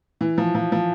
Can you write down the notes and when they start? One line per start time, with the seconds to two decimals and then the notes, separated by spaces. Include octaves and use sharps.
0.21 E3
0.38 F3
0.55 F3
0.72 F3